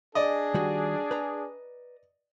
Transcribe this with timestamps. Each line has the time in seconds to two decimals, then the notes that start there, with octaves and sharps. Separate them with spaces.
0.15 D4 G#4 D5 D#5
0.54 D#3 G3 F#4
1.11 B4 A#5